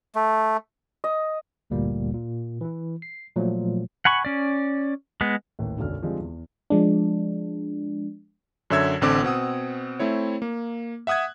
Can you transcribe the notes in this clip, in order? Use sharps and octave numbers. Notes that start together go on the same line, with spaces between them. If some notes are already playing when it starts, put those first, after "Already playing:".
A3
D#5
G1 D2 A#2 G3 A#3
A#2
E3 E4
C7
A#2 F3 F#3 A3
F#5 G#5 B5 C#6
C#4 D5
G#3 B3
D#1 A1 D#2
E1 B1 F#2 D3 F6
D3 F3 G3 G#3 C4
E2
F3 G#3 D4
F#2 D3 C#5 E5 E6 G#6
A1 D3 C4 D6
B2 C4 F#5 D#6
A3 C4 E4 C#5
A#3
E5 F#5 D#6 F#6 G#6